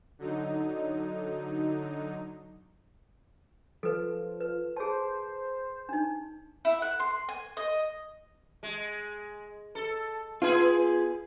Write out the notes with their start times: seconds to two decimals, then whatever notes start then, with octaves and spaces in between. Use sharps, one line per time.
0.19 D3 F#3 D#4
3.83 F3 A4 B4
4.41 B4
4.76 G#4 C5 A5
5.89 D4 D#4
6.65 E4
6.82 F#5
7.00 C6
7.29 G#5
7.57 D#5
8.63 G#3
9.75 A4
10.42 B3 F4 G#4